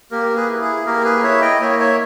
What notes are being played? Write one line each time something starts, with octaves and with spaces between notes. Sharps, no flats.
A#3 G4 A#4
G#4 B4
E4
G#4
A#3 G4 A#4
G#4 B4
E4 C#5 E5
D#5 G5
G5
A#3 C#5 E5
C#5 E5